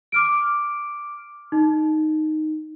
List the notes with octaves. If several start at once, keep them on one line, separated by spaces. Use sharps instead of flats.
D6 F6 D7
D#4